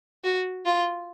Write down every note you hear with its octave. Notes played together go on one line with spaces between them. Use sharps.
F#4
F4